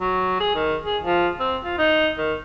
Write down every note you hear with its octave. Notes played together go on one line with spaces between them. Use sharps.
F#3
G#4
D#3
G#4
F3
C4
F4
D#4
D#3